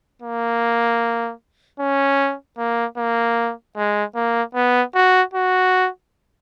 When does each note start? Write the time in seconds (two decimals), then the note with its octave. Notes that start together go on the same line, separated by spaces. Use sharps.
0.22 A#3
1.80 C#4
2.58 A#3
2.97 A#3
3.77 G#3
4.15 A#3
4.55 B3
4.95 F#4
5.34 F#4